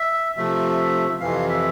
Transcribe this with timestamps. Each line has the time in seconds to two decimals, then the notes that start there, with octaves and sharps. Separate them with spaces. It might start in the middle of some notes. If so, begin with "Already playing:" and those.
Already playing: E5
0.37 C3 F3 A3 E5
1.20 F2 C3 E3 F5
1.49 E5